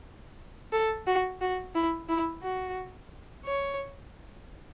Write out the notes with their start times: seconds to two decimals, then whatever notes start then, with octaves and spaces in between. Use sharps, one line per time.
0.73 A4
1.07 F#4
1.41 F#4
1.75 E4
2.09 E4
2.43 F#4
3.45 C#5